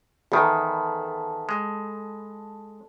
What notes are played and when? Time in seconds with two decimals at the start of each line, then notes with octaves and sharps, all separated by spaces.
0.32 E2 D#3 A4 B5 C6
1.49 G#3